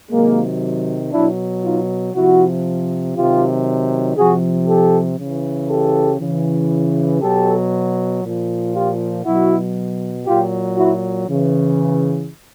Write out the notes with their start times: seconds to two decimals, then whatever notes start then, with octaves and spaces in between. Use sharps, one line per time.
0.10 C3 D#3 F#3 G#3 A#3
1.12 B2 F#3 D4 E4
1.63 D#4 F4
2.14 C3 F3 E4 F#4
3.16 C3 D#3 F#3 F4 G4
4.16 C3 F3 F#4 G#4
4.67 G4 A4
5.19 C#3 E3
5.69 G4 A4
6.20 C#3 E3
7.22 B2 F#3 G4 A4
8.22 A#2 F3
8.74 F4 G4
9.24 B2 F#3 E4 F#4
10.26 A#2 F#3 F4 G4
10.76 E4 F#4
11.27 C#3 E3